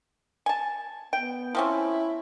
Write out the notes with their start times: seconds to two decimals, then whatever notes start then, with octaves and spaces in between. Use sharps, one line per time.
0.46 G#5 A5
1.13 B3 G5
1.55 F3 C4 C#4 E4